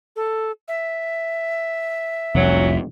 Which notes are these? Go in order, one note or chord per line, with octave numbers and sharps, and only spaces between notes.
A4
E5
F1 C2 F2 A#2 F#3